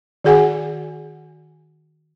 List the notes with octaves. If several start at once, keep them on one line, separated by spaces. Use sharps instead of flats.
D#3 F#4 G#4 F#5 G#5